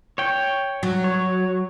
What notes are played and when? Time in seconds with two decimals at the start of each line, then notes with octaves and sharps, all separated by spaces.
0.18 C#5 G5
0.83 F#3
1.04 C#5